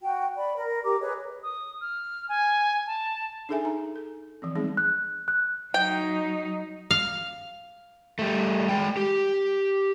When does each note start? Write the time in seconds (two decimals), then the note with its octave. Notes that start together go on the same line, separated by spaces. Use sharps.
0.01 F#4 G5
0.36 D5 B5
0.56 A#4
0.83 G4 A#4 A#5 D6
1.00 G#4 B4 C#5 D#5
1.43 D#6
1.81 F6
2.29 G#5
2.87 A5
3.49 D4 D#4 G#4 A4 E5 G#5
3.64 D#4 G#4 A#5
3.96 A4
4.42 E3 F3 C4
4.55 G3 G#3 B3 C4 D#4 G#4
4.77 F#6
5.28 F#6
5.74 F#3 D#4 G5
6.91 F5
8.19 G3 A3
8.69 G#3 G5
8.97 G4